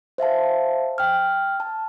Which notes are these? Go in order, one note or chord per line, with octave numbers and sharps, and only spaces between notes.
C5 E5 F5 A5
G5 F6
A5